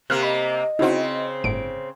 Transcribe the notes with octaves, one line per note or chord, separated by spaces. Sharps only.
C3 A#3 F6 F#6
D#5 B5
C#3 C4 D#4 E4 F#4
G1 A2 D7